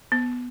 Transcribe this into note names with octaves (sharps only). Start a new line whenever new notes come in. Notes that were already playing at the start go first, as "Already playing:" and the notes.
B3